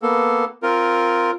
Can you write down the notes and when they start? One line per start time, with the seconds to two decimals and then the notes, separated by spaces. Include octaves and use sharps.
0.02 A#3 B3 A4
0.63 C4 F4 A#4